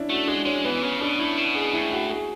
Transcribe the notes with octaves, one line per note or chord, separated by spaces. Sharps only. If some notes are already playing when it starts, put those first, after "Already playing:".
Already playing: C#4 D4 E4
A3 F#4
G#3 D4
G#3 C#4
E3 B3
C#3 C#4
B2 D4
A2 E4
B2
G#4
A2 E4
F#4
G#4